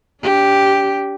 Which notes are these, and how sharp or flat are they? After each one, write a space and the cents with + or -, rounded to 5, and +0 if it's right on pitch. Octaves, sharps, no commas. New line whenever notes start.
D4 -40 G4 +0